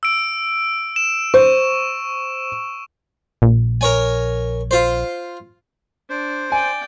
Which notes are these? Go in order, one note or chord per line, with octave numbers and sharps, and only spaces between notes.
E6 D7
E7
C5 C#6
A#1
A#4 C#5 G#5
F4 C5
D4 C5
D5 G5 G#5